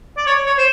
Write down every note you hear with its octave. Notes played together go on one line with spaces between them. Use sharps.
D5
C#5
C#5
C5